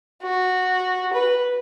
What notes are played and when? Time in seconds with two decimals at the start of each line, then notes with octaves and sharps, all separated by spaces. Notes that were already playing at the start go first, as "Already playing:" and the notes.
0.22 F#4
1.13 B4